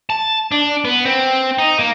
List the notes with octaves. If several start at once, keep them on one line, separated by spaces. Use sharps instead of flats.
A5
D4
B3
C4
D#4
A#3